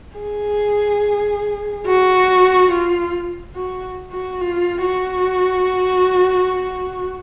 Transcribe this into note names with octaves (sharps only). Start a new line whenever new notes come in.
G#4
F#4
F4
F#4
F#4
F4
F#4